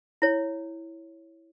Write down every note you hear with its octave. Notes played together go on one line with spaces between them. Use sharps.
E4 C#5